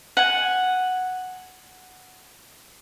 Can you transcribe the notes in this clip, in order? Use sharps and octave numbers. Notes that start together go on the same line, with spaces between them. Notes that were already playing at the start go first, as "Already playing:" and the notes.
F#5 G#5